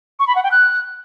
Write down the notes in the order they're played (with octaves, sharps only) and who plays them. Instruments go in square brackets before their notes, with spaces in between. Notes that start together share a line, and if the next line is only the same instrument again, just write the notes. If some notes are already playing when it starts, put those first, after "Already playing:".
[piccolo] C#6
B5
F#5
G5
F#6